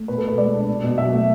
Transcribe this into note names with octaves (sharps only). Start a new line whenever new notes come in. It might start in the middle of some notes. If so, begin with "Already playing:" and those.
Already playing: A3
B2 B4
A4
B2 B4
G#3 D5
D4
B2
B2
F#3 E5
A3